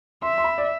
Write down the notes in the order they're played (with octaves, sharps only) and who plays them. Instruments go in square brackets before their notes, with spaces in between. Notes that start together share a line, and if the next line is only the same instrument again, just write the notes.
[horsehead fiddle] E5 [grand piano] C6
[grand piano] C6
B5
D5